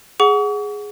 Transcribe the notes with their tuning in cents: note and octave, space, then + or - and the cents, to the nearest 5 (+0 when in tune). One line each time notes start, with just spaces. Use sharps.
G#4 +0 F#5 -5 C#6 +40